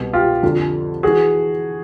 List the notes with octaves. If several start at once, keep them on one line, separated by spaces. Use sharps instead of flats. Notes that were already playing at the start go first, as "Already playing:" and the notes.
Already playing: C2 B2
F4 G4
F2 D3 F3
E3 F#4 G#4